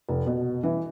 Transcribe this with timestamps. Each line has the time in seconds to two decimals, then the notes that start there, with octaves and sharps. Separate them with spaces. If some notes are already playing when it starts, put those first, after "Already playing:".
0.09 F1
0.26 B2
0.63 E3